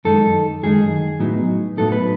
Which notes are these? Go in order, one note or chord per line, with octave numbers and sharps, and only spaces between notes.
F#2 D#3 G#3 D#4 A4
F#2 D#3 G#3 D#4 G#4
A2 F#3 B3 D#4
A2 F#3 B3 D#4 A4
B4